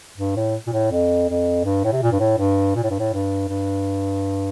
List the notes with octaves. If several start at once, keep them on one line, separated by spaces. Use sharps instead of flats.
G2
A2
A#2
A2
F2
F2
G2
A2
C3
A#2
G2
A2
G2
A#2
A2
G2
A2
G2
G2